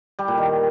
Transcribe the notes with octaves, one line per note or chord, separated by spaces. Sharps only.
G3
A#2
D#3